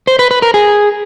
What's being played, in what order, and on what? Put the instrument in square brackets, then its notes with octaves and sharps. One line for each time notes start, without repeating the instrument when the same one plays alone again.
[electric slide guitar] C5
B4
B4
A#4
G#4